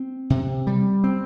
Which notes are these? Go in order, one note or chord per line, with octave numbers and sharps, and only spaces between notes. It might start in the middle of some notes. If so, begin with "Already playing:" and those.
Already playing: C4
C3
G3
C4